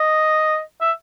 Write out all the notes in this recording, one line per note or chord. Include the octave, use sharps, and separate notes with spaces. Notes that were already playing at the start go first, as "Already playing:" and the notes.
Already playing: D#5
E5